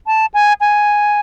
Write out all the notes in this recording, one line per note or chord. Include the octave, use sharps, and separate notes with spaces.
A5
G#5
G#5